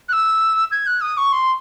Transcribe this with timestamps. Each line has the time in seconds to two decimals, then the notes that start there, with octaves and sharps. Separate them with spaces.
0.09 F#6
0.13 E6
0.72 G#6
0.87 F#6
1.01 D#6
1.17 C#6
1.32 C6